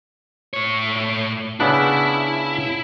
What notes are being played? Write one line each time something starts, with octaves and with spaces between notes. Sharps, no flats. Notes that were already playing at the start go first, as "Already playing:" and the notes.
A2 C#5
C#3 B3 D4 E4